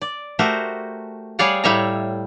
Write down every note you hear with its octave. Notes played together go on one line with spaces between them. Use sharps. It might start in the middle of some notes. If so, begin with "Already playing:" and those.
D5
A3 F#4 G4 A#4 C5
G3 G#4 C#5 D5 F5 F#5
A2 G3 C#5 E5 F5 A#5